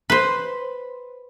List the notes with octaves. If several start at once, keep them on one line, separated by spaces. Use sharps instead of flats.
B4 C5